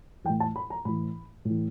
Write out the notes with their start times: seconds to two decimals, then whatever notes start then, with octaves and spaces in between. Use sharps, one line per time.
0.24 E3 G5
0.30 A2
0.40 A5
0.56 B5
0.70 A#5
0.85 A2 E3 B5
1.45 A2
1.50 E3